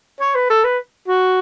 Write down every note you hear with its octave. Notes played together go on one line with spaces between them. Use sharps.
C#5
B4
A4
B4
F#4